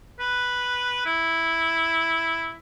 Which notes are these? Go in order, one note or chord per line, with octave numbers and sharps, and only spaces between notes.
B4
E4